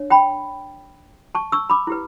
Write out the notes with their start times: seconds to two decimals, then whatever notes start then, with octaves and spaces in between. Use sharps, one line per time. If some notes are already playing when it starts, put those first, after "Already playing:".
Already playing: D4 C#5
0.10 G5 B5
1.35 A5 C#6
1.52 C#6 E6
1.70 B5 D6
1.87 E4 G4 B4